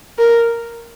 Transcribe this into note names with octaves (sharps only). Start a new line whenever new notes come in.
A#4